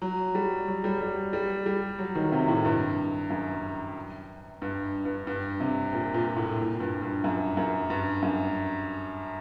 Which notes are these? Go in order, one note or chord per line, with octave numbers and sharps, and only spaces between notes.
F#3
G3
F#3
G3
G3
G3
G3
F#3
D#3
C3
A2
G2
F#2
G2
G2
G2
C3
A#2
A#2
A2
A#2
G2
G2
F#2
F#2
G2
F#2